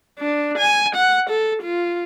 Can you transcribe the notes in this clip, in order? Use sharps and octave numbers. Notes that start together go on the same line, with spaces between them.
D4
G#5
F#5
A4
F4